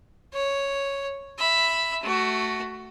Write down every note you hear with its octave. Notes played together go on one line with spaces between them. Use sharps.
C#5
E5 B5
A3 F#4